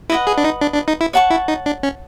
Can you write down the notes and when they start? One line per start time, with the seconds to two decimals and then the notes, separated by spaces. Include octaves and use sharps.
0.10 E4 B4 D#5 F#5
0.27 G#4
0.38 D4
0.44 D#4
0.61 D4
0.74 D4
0.88 D#4
1.01 E4
1.13 C#5 F#5 A5 C#6
1.30 E4
1.48 D#4
1.66 D4
1.83 C#4